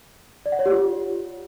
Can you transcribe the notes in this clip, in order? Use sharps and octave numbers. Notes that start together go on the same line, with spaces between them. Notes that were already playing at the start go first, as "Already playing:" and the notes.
D5
F#5
C#5
G4
F4